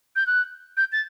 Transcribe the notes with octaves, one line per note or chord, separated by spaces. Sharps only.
G6
F#6
G6
A6